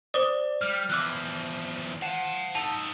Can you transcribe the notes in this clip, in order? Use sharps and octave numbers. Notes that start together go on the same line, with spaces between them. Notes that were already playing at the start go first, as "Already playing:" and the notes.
C5 D5 D6 D#6
G3 F6
E2 F3 D6 E6 F#6
F5 F#5 A5
D#4 A4 A5 F7